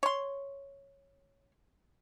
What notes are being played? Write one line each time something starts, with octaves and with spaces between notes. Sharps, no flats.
C#5 C6